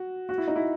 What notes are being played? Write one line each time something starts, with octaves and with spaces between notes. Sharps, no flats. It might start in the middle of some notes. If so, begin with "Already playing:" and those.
Already playing: F#4
F#4
E4
D#4
E4